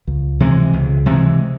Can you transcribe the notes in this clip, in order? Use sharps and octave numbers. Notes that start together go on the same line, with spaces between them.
C#2
C3 E3 G#3
C#2
C3 E3 G#3